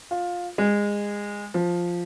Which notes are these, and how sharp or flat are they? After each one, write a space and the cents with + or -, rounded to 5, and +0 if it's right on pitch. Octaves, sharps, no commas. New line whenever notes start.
F4 +15
G#3 -20
F3 +0